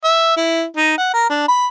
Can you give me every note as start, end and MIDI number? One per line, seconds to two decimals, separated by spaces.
0.05 0.37 76
0.37 0.64 64
0.77 0.95 63
0.98 1.11 78
1.14 1.29 70
1.30 1.43 62
1.48 1.67 83